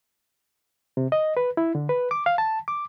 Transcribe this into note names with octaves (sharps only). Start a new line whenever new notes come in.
C3
D#5
B4
E4
D3
B4
D6
F5
A5
D6